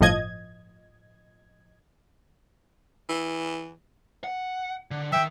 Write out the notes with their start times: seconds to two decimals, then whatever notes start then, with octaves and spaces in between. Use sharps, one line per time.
0.01 G1 A2 F3 D#5 G#6
3.09 E3
4.24 F#5
4.91 D3
5.12 D#3 E3 E5 G5